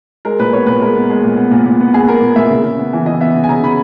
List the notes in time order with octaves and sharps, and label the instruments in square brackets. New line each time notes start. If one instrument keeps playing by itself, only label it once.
[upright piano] G#3 A#4
A#2 B4
B3 C#5
A#2 B4
G#3 A#4
B3
G#3
A#2
B3
A#2
A#2
B3
B3 G#4
B3 A#4
A#2
A#2 E5
C#3
C#3
B3
E3
E3 D#5
B3 E5
C#3
G#5
C#3 A#5
C#3 B5